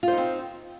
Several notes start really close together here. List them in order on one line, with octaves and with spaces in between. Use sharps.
F4 C5 D#4 C4